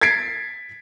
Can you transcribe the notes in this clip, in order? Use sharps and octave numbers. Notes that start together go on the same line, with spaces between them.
G#6 A6 B6 C7 D7